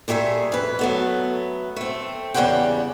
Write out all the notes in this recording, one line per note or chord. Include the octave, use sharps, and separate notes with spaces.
A#2 G3 A3 G#4 E5
F2 B4
F#3 A3 B3
A3 C4
E2 C#3 G3 A#3 F#5 G5